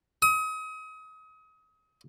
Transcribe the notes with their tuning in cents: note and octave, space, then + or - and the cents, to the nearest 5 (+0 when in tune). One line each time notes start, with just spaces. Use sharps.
D#6 +35